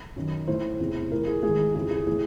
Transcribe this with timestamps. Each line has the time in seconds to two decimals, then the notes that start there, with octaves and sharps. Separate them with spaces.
0.16 F#2 D#3
0.47 A2 E3 C5
0.80 E2 C3 E3
1.11 A2 E3 A#4
1.27 G#4
1.43 G#2 G#4
1.48 D#3
1.75 F2 C#3 E3 G#4
1.91 G#4
2.07 A2 E3 G#4